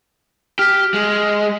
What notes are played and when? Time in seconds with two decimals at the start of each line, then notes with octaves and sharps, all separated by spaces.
0.59 G4 F6 B6
0.94 G#3